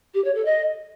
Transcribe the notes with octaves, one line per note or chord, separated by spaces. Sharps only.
G4
C#5
A4
D#5